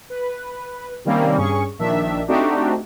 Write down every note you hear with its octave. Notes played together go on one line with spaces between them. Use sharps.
B4
C3 D#3 G3 A#3 C4 C#4
G2 C#4 G#4 C#6
A#1 D#3 D4 E5
A3 C4 D4 D#4 F#4 G4